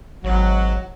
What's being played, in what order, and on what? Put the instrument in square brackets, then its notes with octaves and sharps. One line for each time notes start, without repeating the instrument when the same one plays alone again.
[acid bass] G#1 [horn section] F#3